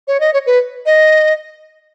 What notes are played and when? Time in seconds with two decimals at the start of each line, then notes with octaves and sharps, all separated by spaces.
0.08 C#5
0.20 D#5
0.33 C#5
0.47 B4
0.86 D#5